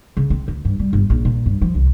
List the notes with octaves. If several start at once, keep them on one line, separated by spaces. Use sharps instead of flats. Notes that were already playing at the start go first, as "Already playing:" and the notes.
C#3
C4
D2
G2
G3
G1
A#1
A#2
G2
F3
C2